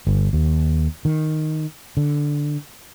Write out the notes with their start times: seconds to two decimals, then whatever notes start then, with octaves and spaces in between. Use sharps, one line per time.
0.07 G1
0.33 D#2
1.05 D#3
1.97 D3